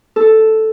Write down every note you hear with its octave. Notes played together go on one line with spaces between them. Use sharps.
A4